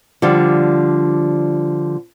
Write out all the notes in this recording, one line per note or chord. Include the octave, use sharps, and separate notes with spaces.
D3 F3 G3